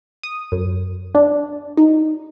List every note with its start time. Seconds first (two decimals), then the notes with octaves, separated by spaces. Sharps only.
0.23 D#6
0.52 F#2
1.15 D4
1.77 D#4